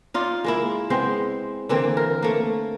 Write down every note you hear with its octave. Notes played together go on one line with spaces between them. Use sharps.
D#4 F4 D5
G#3 A#3 E4
G#3 B3 C4 C5
D3 E3 A#3 C4
A#4
A3 A#3